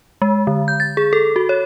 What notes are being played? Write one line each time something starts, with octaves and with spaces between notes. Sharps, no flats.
G#3
D3
G6
A6
G#4
A4
F#4
C#5